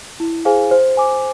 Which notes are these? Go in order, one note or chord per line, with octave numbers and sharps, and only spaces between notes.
E4
G#4 C5 F5 G#5
C5
G#5 D6